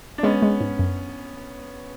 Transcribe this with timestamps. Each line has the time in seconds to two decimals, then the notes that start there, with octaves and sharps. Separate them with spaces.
0.18 D4
0.23 G#3 B3 C#4
0.42 G#3
0.61 G#2
0.79 F#2